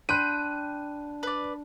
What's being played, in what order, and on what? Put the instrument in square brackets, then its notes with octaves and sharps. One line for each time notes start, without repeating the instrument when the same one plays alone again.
[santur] D4 [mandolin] G5 [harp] B5 C6 F#6 [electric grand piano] D#7
[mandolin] B4 D5